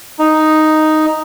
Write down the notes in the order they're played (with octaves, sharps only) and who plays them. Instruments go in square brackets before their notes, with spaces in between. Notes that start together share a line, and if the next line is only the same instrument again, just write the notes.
[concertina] D#4